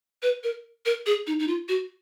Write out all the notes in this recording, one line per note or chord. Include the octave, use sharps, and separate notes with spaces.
B4
A#4
A#4
G#4
D#4
D#4
F4
F#4